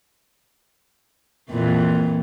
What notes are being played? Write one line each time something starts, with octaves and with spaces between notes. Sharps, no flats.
F2 A#2 E3